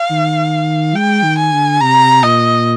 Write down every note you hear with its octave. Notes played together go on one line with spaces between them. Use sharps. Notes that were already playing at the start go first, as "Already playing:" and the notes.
Already playing: F5
D#3
G#3 G5
D#3
G#5
D3
C3 A#5
A#2 D#5